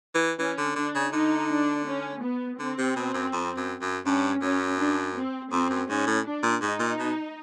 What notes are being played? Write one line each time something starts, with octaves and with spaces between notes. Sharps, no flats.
E3
E3 C#4
D3
D3 D4
C#3
D3 D#4
D4
C#4
B3
D3 C4
C3
B2
F#2
F2
F#2
F#2
G2 C#4
F#2 C#4
D4
C4
F2 C4
F#2
G#2 C#4
A2
D4
A#2
G#2 D#4
A#2
B2